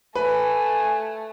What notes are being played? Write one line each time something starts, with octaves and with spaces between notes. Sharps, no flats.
A3 B4 G#5